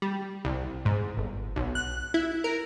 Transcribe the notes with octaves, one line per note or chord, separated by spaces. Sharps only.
G3
C2
G#2
G1
B1
F#6
E4
A#4